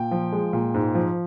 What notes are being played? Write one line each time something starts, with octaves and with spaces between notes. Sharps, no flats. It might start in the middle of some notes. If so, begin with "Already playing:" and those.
Already playing: A#2 G5
F3
G#3
A#2
G#2
F3